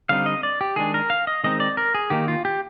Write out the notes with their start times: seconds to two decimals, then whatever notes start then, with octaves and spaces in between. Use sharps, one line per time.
0.09 D3 G3 C4 D#4 F5
0.26 D#5
0.43 D5
0.61 G4
0.76 D#3 G#3 D4 G#4
0.94 A#4
1.10 F5
1.27 D#5
1.44 D#3 G#3 C4 D#4 D#5
1.60 D5
1.77 A#4
1.94 G#4
2.10 D#3 A#3 D#4 G4
2.28 F4
2.45 G4